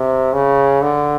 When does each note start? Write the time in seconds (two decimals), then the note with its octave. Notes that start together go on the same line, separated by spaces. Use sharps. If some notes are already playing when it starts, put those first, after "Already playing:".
Already playing: C3
0.33 C#3
0.82 D3